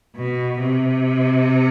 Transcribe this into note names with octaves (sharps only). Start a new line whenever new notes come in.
B2
C3